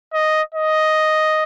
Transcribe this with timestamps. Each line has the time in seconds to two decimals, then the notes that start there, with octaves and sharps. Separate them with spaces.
0.13 D#5
0.54 D#5